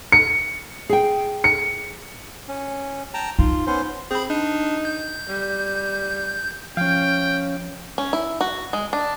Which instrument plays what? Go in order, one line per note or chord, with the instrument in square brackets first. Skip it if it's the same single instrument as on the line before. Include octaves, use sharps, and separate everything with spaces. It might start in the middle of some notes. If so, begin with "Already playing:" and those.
[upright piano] C#7
[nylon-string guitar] G#4 G5
[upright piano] C#7
[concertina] C#4
G5 A5 A#5
[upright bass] D#4 [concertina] F4
[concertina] B3 C#4 C5
[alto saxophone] C4 [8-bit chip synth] G#4 B5
[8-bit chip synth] D4 [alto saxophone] D#4
[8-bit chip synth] G6
[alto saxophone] G3
[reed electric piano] F3 [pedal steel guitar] C#4 F5 [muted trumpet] G5
[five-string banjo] C#4
E4
F#4
G#3
D4